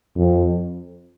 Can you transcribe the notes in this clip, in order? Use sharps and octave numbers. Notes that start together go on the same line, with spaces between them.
F2